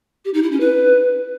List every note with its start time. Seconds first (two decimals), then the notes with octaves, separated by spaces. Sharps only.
0.25 G4
0.34 D#4
0.43 E4
0.52 C#4
0.60 B4